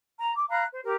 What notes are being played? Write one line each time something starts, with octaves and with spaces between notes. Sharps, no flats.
A#5
D6
F5 A#5 B5 F#6
C5
G4 A#4